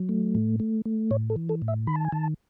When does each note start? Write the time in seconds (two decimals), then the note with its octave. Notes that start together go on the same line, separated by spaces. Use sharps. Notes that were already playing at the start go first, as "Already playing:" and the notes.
Already playing: F#3
0.09 A3
0.35 A2
0.60 A3
0.85 A3
1.11 A2 C#5
1.30 A4
1.36 E3
1.49 A4
1.62 A2
1.68 E5
1.87 D#3 B5
1.96 A5
2.05 G#5
2.12 D#3 A5